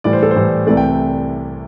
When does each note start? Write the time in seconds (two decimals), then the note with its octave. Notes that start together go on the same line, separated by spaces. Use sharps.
0.04 A2 E3 G3 D5
0.13 C5
0.23 A4
0.31 C5
0.36 A2 E3 G3
0.67 C2 C3 E3 A3 D5
0.77 G5